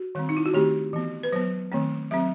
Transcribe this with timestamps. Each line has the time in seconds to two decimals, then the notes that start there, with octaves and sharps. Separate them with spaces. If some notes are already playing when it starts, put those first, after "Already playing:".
Already playing: F#4
0.15 D#3 G3 C4
0.29 D#4
0.37 E4
0.46 F#4
0.54 D#3 A3 C4 G4
0.93 E3 B3
1.23 B4
1.32 F#3 B3 C5
1.72 D#3 A3 C4
2.11 F#3 C4 E5